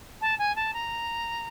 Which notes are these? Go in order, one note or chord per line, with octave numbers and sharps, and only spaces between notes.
A5
G#5
A5
A#5